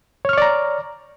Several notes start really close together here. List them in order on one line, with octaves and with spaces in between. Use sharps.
C#5 F6 C#6 D5 A#5